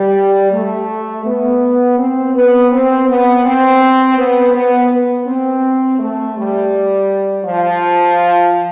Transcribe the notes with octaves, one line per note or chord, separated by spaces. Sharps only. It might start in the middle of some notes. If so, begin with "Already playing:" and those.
Already playing: G3
A3
B3
C4
B3
C4
B3
C4
B3
B3
B3
C4
A3
G3
F3